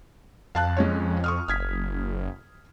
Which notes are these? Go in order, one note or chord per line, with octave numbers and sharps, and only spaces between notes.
F2 F5 A5 F#6
G#3 C#4 C#5
C#6 D#6 F6
F#1 F6 G#6 B6